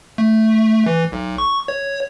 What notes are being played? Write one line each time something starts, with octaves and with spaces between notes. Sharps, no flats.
A3
E3
B1
C#6
C#5